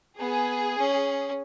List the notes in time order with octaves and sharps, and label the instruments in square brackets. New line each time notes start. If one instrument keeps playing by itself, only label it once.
[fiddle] B3 [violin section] G#4
[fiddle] C#4